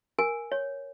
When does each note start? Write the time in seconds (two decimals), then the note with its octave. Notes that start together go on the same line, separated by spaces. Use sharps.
0.19 A#4 G#5
0.52 C#5